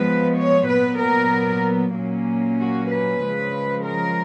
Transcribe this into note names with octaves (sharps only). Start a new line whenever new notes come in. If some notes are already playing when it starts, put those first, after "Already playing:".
Already playing: F3 G#3 B3 B4
C#5
A#2 F#3 B3 B4
A#4
A#2 F#3 A#3 C#4
F#4
B4
C#3 F3 G#3
A#4